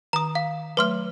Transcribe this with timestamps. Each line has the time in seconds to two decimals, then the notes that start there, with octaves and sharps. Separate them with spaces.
0.13 D#3 A#5 D#6
0.35 F5
0.77 F#3 A3 B4 C6 F6